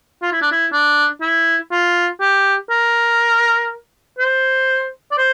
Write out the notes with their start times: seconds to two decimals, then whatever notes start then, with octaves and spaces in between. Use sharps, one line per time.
0.22 F4
0.32 E4
0.42 D4
0.52 E4
0.72 D4
1.21 E4
1.72 F4
2.21 G4
2.70 A#4
4.19 C5
5.11 D5
5.18 C5